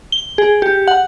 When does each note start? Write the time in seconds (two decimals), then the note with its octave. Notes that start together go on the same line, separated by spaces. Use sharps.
0.12 G7
0.38 G#4
0.62 G4
0.88 F#5